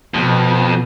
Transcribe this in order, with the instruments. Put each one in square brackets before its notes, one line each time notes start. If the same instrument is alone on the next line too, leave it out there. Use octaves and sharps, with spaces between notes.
[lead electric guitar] F2 [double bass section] B2